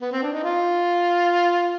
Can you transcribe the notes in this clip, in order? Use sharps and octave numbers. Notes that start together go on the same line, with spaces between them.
B3
C4
D4
D#4
F4